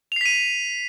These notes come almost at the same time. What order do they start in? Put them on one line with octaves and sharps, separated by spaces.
F7 C7 B6 D#7